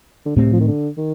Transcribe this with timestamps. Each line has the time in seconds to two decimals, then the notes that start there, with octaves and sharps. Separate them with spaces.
0.26 D3
0.36 A2 C3 A3 C4
0.53 F3
0.60 D#3
0.67 D3
0.97 D#3